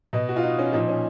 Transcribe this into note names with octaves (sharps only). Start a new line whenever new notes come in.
B2 D#5
F#4
F4
D#4
C#4
A#2 F3 D#4
C#4